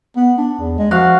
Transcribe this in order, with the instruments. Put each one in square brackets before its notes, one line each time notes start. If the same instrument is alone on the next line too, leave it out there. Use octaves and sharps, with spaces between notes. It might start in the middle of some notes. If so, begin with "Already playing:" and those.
[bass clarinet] B3
D4
E2
G#3
[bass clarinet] F3 [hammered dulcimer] F#4 F5